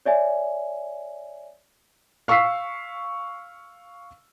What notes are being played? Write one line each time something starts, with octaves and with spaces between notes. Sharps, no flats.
C#5 D5 E5 G#5
F5 C#6 E6 B6 C7